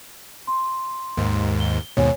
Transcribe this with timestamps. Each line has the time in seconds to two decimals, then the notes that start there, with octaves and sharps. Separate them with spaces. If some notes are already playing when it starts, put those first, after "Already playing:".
0.47 C6
1.17 D#2 G#2
1.60 G7
1.97 D#2 G#2 B2 C#5 G#5